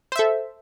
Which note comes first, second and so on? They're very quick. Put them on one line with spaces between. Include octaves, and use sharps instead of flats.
C5 E5 A4